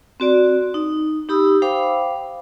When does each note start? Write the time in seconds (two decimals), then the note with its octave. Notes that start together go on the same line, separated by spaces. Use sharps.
0.20 C4 F#4 D5
0.74 D#4
1.29 D#4 G4 B5 D#6 E6
1.62 C5 F5 G5 B5 D6